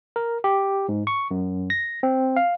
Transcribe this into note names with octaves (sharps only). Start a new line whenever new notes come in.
A#4
G4
G#2
C#6
F#2
A#6
C4
F5